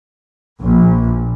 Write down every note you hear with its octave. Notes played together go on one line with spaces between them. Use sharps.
A#1